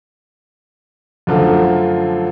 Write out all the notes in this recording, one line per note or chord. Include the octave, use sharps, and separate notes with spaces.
F#2 D3 F3 A3